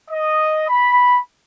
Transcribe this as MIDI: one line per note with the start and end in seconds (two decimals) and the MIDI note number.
0.11 0.65 75
0.69 1.19 83